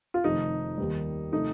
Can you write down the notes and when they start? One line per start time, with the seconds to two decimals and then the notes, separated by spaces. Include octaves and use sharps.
0.14 F4
0.24 F1 F2 D#3 D#4
0.78 D#2 D#3 G3
1.32 C3 F3 A3 D#4